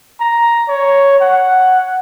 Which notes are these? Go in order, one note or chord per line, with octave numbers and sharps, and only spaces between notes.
A#5
C#5
F#5